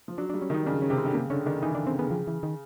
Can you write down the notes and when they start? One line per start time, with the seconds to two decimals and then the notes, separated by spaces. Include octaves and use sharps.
0.08 F3
0.18 F#3 D4
0.30 D4
0.34 G3
0.42 C#4
0.50 D#3 D#4
0.66 C#3 D4
0.82 C#4
0.90 C3
0.98 C4
1.06 D3
1.14 C#3 A#3
1.30 D3 C#4
1.46 D#3 D4
1.62 E3 D#4
1.74 D3 D4
1.87 C#3 C4
1.99 C#3 B3
2.11 F3
2.27 E3
2.43 D#3